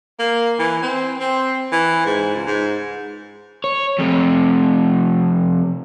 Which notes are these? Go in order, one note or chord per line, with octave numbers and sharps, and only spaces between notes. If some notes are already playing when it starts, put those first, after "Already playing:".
A#3
E3
C4
C4
E3
G#2
C#2
G#2
C#5
F2 C3